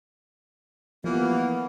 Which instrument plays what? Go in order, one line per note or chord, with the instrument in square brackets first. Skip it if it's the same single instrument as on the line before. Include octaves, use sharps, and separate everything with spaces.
[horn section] E3 G3 A#3 [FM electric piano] F3 [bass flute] B3